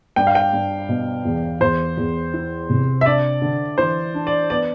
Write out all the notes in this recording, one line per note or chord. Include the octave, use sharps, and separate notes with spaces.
G2 G5
F5
G5
G2
B2
E2
E2 C5
E2
E4
C3
E5
D4 D5
D3
E3 C5
D4
D5
B3 D5